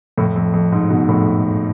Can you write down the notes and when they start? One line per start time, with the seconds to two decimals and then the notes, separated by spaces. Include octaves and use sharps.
0.18 F2 A2
0.36 F2
0.54 F2
0.72 G#2
0.90 G#2 B2
1.09 F2 A2